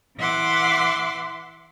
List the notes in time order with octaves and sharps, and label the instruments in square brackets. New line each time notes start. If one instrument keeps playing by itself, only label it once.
[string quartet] E3 E5 F#5 C6 D6